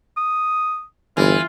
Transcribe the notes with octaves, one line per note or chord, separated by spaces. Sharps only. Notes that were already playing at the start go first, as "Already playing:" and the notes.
D#6
G1 E3 F4